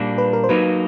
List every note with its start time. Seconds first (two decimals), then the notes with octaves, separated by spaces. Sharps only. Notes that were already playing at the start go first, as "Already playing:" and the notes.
Already playing: A#2 G3 A#3 D4
0.18 B4
0.33 A#4
0.44 C5
0.49 F#3 A#3 D#4 B4